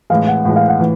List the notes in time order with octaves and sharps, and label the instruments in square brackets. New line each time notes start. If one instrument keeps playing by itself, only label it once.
[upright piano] A2 E3 G#3 [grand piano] F5
[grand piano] F#5
[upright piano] A2 E3 G#3 [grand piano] F#5
[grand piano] F5
F#5
[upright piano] A2 E3